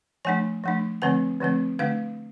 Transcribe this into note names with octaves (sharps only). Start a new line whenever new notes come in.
F3 A3 D4 G#5
F3 A3 D4
D3 F3 A3 C4 G#5
D3 F3 A3 C4
D3 A3 D4 F5